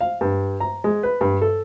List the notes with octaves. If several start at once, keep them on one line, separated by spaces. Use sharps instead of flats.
F5
G2
A#5
G#3
B4
G2
A4